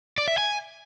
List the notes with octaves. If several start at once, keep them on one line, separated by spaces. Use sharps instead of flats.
D5
E5
G#5